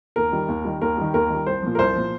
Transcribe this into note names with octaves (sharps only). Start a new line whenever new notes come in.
D#2 A#4
D#3 G3
D#2
D#3 G3
D#2 A#4
D#3 G3
D#2 A#4
D#3 G3
C2 C5
A#2 F3
A#4
C2 C5
A#2 F3